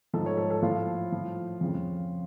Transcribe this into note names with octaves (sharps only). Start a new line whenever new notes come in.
G#2 F3 A4
C#5
A4
A4
A2 F3 F4
A2 F3
F2 C#3 F3